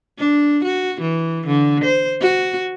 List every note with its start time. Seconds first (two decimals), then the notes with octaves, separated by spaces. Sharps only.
0.18 D4
0.64 F#4
1.01 E3
1.47 D3
1.84 C5
2.21 F#4